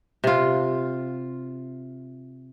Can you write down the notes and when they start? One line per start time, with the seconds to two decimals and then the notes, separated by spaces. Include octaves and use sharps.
0.24 C3 F4